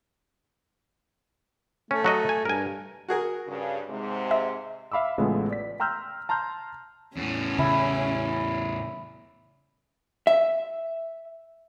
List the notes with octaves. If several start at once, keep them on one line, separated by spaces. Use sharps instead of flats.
A3 C#4
F#3 F#4 D#5
G#5
G2 A#4 G#5
F#4 G#4 A#4
G2 C#3
G#2 C3 G#3
E5
E5 F5 B5 D6 E6
A1 C#3 G#3 A3 B3 F4
D5 B6
G5 A#5 C6 E6 F6 G6
A5 A#5 C6 F6 G6
E2 A2 C#4
C#3 E4
E5